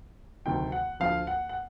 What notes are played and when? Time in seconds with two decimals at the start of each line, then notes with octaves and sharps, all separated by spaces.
0.45 D2 C3 D#3 F#3 G5
0.72 F#5
1.00 D2 D3 F3 F5
1.27 F#5
1.49 F#5